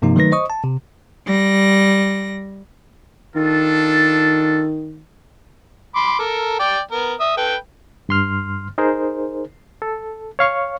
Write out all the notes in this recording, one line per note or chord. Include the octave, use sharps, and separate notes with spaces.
G2 C3 F3 A#3 D#4
D#3 F#3 A3 D#4 B4 A#6
C5 D#5 C#6 D#6
A5
C3
G3 A#6
D#3 D4 F4 A4
B5 C6 D6
A4 A#4
D5 G5
B3 A#4
E5 D#6
A4 B4 G5
G2 C6 F6
D#4 G#4 A#4 C5
A4
C#5 F5 C#6